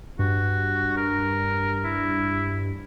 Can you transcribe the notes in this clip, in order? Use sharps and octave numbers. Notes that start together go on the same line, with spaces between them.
G2 F#4
A#4
E4